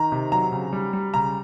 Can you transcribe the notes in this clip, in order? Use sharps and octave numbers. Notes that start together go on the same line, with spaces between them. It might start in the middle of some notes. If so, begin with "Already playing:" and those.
Already playing: D#3 A#5
C3
F#3 A#5
C#3
G3
G3
C#3 A#5